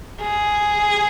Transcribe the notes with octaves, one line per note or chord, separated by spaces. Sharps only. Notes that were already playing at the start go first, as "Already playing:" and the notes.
G#4